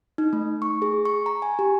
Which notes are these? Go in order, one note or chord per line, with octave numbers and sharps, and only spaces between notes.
D#4
A3
C#6
G#4
C#6
A#5
G#5
G4